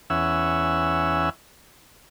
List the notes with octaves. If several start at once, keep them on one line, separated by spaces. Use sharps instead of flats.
E2 C#4 E5 F#5 G#5 E6